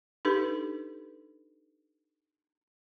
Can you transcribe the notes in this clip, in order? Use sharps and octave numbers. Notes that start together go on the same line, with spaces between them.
D4 D#4 G4 A4 B4